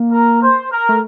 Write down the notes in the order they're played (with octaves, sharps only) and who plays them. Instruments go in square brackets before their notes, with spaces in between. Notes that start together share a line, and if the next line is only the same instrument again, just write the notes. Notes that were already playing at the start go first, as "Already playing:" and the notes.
Already playing: [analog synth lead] A#3
[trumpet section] A#4
C5
A#4
[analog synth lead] A3